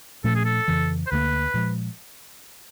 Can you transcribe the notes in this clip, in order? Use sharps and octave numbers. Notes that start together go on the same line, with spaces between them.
A#2 F3 A3 C#4 A4
G#4
A4
F2 C#3 E3
C5
D2 D3 F#3 A#3 B4
A#2 F3 G#3